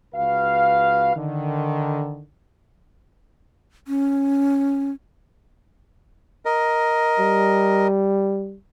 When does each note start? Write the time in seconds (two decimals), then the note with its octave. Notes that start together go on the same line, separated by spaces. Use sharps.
0.15 C#2 F#4 B4 F5
1.17 D3 D#3
3.88 C#4
6.45 A#4 D#5
7.19 G3